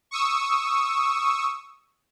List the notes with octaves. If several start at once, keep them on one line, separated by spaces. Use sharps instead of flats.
C#6 D#6 E6